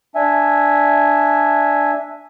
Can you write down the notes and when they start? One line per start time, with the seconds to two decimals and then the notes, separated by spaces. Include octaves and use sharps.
0.15 D4 E5 G#5